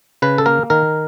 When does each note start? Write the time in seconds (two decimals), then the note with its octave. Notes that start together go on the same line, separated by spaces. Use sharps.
0.22 C#3 B4
0.38 A4
0.46 A#3 A#4
0.70 D#3 A#4